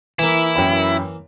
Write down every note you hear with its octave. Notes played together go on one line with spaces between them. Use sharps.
E3 A#3 E4
F#2 G5 B5